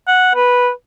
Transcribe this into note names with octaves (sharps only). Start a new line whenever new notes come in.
F#5
B4